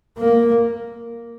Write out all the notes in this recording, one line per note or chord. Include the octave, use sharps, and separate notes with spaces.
A#3